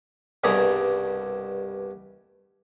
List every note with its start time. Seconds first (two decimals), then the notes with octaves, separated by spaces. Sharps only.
0.44 C2 G2 B2 G#4 D5 A#5